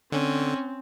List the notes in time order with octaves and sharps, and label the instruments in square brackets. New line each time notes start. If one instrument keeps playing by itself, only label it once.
[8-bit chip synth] D3 [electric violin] C4 [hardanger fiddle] C#4